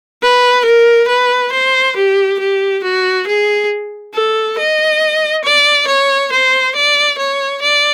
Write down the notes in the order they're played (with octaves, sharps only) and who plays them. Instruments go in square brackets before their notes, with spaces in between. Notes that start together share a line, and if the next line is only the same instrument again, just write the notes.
[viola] B4
A#4
B4
C5
G4
G4
F#4
G#4
A4
D#5
D5
C#5
C5
D5
C#5
D5